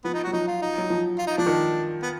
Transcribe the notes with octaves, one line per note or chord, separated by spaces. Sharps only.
F3 B3
D#4
F#4
F#3
F3 D#4
F4
D#4
F#3
F3
F4
D#4
F3 D4
D#3
B3